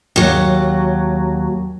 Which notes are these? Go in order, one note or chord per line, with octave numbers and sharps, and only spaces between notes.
D#2 F#3